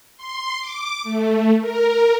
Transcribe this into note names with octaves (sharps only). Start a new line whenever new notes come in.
C6
D6
A3
A#4